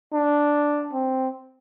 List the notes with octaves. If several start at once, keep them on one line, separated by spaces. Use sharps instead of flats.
D4
C4